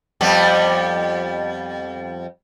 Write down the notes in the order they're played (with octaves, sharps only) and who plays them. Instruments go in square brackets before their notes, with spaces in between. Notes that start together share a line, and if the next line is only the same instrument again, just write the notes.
[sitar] F2 G3 B3